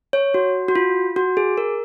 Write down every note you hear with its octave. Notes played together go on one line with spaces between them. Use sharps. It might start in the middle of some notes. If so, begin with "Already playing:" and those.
C#5
F#4
F#4
F4
F#4
G#4
A#4